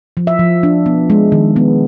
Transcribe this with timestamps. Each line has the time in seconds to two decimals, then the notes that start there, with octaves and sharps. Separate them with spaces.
0.17 F3
0.27 E5
0.39 F3
0.63 D4
0.86 B3
1.10 G#3
1.32 D#3
1.56 B3